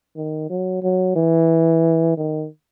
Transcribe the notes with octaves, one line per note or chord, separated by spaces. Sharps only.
D#3
F#3
F#3
E3
D#3